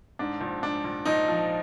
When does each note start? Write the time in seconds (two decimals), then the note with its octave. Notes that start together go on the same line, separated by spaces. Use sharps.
0.19 G#2 D4
0.41 A#1
0.63 G#2 D4
0.84 A#1
1.05 A#1 D#4
1.28 F3